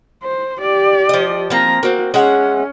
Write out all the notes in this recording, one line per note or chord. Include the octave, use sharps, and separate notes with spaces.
C5
G4 D5
F3 D#5
F3 A#3 C4 A#5
A#3 C4 F#4
G#3 C#4 E5 F#5